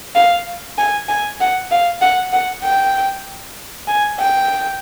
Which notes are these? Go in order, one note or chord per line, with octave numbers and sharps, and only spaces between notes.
F5
G#5
G#5
F#5
F5
F#5
F#5
G5
G#5
G5